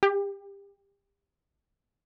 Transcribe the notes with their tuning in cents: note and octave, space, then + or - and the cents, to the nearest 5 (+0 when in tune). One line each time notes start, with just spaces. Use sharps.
G4 +30